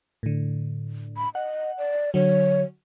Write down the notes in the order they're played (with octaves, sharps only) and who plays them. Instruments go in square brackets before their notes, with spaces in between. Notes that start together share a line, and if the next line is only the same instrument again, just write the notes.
[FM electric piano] A2 D3
[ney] B5
[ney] D#5 [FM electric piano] F#5
[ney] D5
[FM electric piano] D3 F#3 [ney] C#5